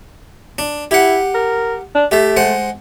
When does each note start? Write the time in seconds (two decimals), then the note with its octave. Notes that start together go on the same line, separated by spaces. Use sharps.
0.58 D4
0.91 E4 G4 F#5
1.34 A#4
1.95 D4
2.11 A3 G4 E5
2.37 G#3 C5 F#5